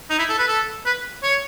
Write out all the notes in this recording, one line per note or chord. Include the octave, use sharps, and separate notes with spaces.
D#4
E4
A4
B4
A4
B4
C#5